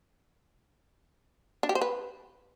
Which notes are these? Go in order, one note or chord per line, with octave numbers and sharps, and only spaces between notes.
D4
G4
C5
B4